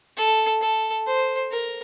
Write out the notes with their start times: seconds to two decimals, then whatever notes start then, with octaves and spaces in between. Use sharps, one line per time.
0.17 A4
0.61 A4
1.06 C5
1.52 A#4